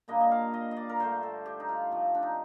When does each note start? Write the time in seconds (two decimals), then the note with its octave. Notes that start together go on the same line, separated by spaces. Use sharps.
0.08 A#2 G3 A#3 D4 D#5
0.20 D#5
0.31 F5
0.54 D#5
0.71 D#5
0.77 D5
0.89 A#4
1.00 G2 D3 A3 C5
1.23 A4
1.46 G4
1.60 D#4
1.69 F4
1.91 C3 F3 A3
2.15 D4
2.23 D#4